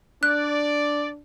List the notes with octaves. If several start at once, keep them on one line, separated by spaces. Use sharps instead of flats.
D4 D5 F#6